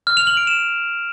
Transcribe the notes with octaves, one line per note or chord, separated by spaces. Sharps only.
F6
F7
F#7
D7
E7